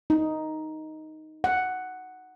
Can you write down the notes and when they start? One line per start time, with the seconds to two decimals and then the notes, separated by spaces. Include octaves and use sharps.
0.10 D#4
1.44 F#5